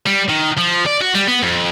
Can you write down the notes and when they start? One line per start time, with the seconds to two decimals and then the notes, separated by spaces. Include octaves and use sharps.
0.06 G3
0.29 D#3
0.57 F3
0.86 D5
1.01 F#4
1.14 G3
1.28 B3
1.43 F2